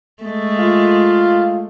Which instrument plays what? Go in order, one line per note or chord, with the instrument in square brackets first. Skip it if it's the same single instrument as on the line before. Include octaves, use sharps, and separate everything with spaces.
[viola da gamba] G#3 A3
[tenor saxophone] F4